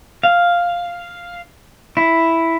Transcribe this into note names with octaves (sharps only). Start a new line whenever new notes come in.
F5
E4